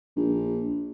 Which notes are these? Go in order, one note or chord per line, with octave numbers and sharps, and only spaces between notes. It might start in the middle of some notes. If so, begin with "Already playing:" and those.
A#1